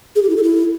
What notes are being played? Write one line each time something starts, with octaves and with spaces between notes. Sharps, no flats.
G#4
G4
E4
A4
E4